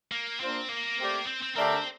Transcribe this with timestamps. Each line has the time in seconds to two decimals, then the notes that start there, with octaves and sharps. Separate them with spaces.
0.12 A#3
0.40 A#3 C4 D4 F4 C5
0.69 A#3
0.98 A3 C4 G4 D5
1.27 C4
1.42 C4
1.56 D3 A3 C4 D4 G4 A#4